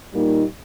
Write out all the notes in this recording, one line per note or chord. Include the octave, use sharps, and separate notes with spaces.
A#2 G3 A#3 D#4